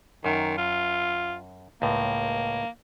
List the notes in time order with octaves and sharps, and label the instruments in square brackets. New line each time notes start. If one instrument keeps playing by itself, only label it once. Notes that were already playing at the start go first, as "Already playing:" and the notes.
[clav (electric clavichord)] F#2 [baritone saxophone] D#3
[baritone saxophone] F4
[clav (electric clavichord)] C#2 A2 [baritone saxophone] A#3